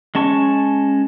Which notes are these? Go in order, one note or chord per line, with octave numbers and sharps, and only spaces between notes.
G#3 C#4 A5 C#6